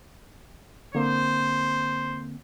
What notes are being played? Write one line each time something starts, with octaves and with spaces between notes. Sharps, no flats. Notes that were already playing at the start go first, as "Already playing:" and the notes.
D3 A#3 C4 C5